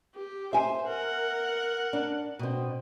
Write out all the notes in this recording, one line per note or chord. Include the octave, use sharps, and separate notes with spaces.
G4
C5 E5 G#5
A#4 F#5
D4
B2 C4